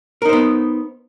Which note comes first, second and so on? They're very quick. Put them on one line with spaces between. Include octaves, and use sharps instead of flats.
A#4 D#4 C5 B3